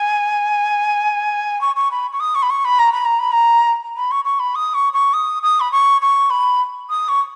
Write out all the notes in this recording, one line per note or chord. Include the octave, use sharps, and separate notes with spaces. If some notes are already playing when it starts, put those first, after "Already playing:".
Already playing: G#5
C#6
C#6
B5
C#6
D#6
C#6
B5
C#6
B5
A#5
B5
A#5
B5
A#5
B5
C#6
C#6
B5
D#6
C#6
C#6
D#6
D#6
B5
C#6
C#6
B5
D#6
C#6